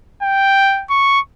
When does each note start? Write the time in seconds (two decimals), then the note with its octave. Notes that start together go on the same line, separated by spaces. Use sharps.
0.23 G5
0.90 C#6